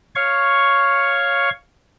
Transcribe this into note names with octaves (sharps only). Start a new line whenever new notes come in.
C#5 F5 C#6